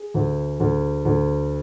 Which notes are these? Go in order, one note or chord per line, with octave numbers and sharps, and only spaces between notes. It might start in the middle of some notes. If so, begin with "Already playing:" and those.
Already playing: G#4
D2
D2
D2